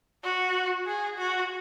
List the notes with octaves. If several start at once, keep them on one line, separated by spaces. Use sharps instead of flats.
F#4
G#4
F#4